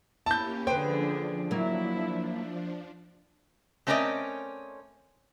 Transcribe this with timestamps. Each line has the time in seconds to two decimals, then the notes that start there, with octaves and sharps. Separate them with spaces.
0.26 A#3 C#4 E4 G4 A5 G6
0.67 D3 F3 D4 G#4 B4 C5 G5
1.51 F#3 A#3 E4
3.87 A3 C4 C#4 A#4 D5 D#5